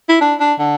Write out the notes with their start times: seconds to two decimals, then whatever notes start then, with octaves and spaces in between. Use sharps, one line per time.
0.09 E4
0.21 D4
0.40 D4
0.59 D3